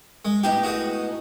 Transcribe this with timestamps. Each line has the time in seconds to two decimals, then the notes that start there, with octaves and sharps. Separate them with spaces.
0.25 G#3
0.43 A2 B3 D#4 G4
0.63 F#4 G#4 D#6